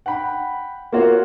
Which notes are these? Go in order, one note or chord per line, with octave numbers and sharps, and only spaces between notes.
F#5 G5 B5
A#3 B3 F4 F#4 C#5